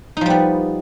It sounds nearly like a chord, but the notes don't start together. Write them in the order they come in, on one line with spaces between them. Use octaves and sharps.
D#4 F3 G3 B3